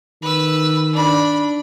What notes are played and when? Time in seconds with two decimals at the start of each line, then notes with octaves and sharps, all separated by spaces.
0.22 D#3 B4 E6
0.93 D4 B5